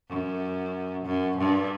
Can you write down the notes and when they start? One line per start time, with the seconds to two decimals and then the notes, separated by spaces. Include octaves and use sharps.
0.09 F#2
1.06 F#2
1.38 G2